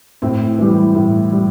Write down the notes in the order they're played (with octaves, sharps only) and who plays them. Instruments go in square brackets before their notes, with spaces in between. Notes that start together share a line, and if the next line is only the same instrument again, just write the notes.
[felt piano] A2 C4
E3 G3
A2
G3